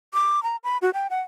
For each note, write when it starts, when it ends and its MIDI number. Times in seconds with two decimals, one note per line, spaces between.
0.14 0.43 86
0.43 0.56 82
0.64 0.78 83
0.82 0.90 66
0.94 1.07 79
1.10 1.21 78